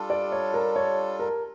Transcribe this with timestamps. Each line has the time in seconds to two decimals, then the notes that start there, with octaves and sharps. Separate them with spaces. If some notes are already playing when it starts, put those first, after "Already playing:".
Already playing: G3 D4 F4 A4
0.10 D5
0.32 C#5
0.54 A#4
0.76 C#5
1.19 A#4